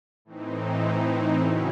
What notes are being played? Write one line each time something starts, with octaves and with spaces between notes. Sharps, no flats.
A2 E3 C4 D#4
C#3 F#3 C#4 E4